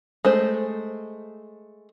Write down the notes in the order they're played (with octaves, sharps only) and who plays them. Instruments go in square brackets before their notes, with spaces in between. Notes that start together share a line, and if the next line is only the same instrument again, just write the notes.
[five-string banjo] G#3 A3 C5